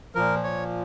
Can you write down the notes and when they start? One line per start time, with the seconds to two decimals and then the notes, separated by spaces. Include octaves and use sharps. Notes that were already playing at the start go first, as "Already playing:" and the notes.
0.15 A#2 F3 A#4
0.44 C#5